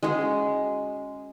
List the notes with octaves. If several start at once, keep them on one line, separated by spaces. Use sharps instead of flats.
G#3 C#4 F#4 G#4